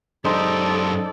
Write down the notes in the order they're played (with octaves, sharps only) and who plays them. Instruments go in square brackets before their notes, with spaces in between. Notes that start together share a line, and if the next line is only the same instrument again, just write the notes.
[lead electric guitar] F#2 G4 [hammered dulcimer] D#4 C5 D#5 [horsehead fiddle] A4 D5